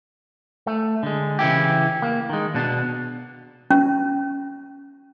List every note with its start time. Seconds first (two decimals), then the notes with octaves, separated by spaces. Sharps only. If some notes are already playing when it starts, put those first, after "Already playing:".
0.67 A3
1.03 D3 G#3
1.39 C#3 E3 E4 G4
2.02 A#3
2.29 D#3 G#3
2.54 B2 D4
3.71 C#4